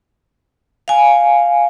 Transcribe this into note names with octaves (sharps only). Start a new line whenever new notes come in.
F5 G#5